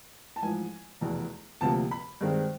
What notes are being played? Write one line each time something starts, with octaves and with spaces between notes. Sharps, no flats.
A5
A1 G#2 F3 G#5
F1 E2 B2
D2 C3 F3 A#3 A5
B5
G2 D#3 G#3 C4